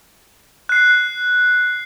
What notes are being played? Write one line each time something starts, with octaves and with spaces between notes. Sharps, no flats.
F#6 C7